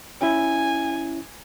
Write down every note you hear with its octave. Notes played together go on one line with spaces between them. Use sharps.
C#4 E4 G#5